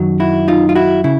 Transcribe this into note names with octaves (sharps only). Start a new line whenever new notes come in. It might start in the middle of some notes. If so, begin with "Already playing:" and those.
Already playing: F#2 D#3 F#3
E4 F#4
D#4 F4
F4
E4 F#4
C#3 E4